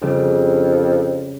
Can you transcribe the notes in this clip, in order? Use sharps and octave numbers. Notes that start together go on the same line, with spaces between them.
F2 C#3 G3 D4